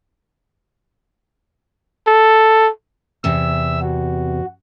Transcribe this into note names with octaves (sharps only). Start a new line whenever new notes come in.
A4
E2 C3 E5 E6
F#4